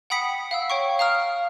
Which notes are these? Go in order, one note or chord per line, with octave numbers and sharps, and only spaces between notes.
F#5 G5 B5 D#6 B6 C#7
F5 F#5 E6
C#5 G5 C#6
F5 A#5 D#6 F6